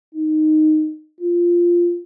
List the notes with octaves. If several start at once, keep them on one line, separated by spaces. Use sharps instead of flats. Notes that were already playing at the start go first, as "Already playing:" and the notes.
D#4
F4